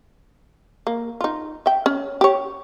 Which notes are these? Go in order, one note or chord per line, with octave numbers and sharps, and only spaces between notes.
A#3
D#4 F4
E5 G5
C#4
G4 C#5